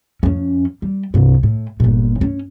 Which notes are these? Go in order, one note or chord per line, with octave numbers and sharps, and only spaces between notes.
F2 C#4
G3
C2 G2
A2
G1 A#2
C#4